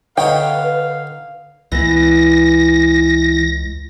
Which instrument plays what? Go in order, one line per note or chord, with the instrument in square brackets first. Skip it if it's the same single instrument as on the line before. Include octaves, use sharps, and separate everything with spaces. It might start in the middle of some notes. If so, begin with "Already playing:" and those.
[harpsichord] D3 D#4 C#5 [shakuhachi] B4 [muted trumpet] F5 [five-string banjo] G5
[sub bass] C#2 [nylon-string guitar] E3 B3 [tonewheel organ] A#6